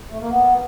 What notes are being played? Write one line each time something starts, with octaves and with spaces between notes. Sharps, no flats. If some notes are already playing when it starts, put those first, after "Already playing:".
A3
A#3
B3